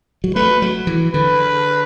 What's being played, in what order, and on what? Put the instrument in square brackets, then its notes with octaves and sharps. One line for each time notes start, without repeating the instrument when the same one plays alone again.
[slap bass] F#3
[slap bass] A3 [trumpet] B4
[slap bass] F#3
E3
[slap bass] D3 [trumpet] B4